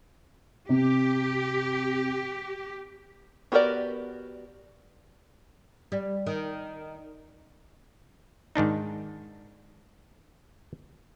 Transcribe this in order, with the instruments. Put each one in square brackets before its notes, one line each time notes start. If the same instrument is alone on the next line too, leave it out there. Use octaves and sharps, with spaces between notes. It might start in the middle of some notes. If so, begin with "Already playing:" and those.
[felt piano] C3 [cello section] G4
[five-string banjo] B3 F#4 G4 A#4 D5
[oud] G3
D#3
[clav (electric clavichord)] G#2 D#3 D4 D#4